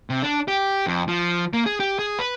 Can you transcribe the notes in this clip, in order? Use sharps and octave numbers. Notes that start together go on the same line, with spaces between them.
C3
D4
G4
F2
F3
A#3
G#4
G4
G#4
B4